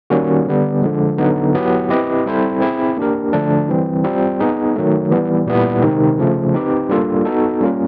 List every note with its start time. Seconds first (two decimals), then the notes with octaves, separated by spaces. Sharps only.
0.10 D#3 G3 A#3 C#4 F#4
0.46 D3 G3 B3
0.82 D3 F3 G#3
1.18 D3 F#3 B3 D#4
1.54 F#3 B3 E4 G4 B4
1.90 C4 E4 G4 B4 D#5
2.26 G3 C4 E4 A4 C5
2.61 C4 E4 G#4
2.97 A#3 D4 G4 A#4
3.33 D3 F3 A3 D4
3.69 E3 G3 C4
4.04 G3 C4 F4
4.40 B3 D#4 G#4
4.76 D#3 F#3 A3
5.11 E3 G3 B3
5.46 A#2 G3 B3 E4
5.82 C3 D#3 G#3 C4 D#4
6.19 C#3 F3 A3
6.54 C4 D#4 G4 B4
6.89 G3 A#3 D4 F4 A4
7.25 B3 D#4 F#4 A4
7.61 G3 A#3 C#4 F4 A#4